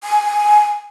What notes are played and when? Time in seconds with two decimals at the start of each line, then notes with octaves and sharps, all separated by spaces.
0.04 G#5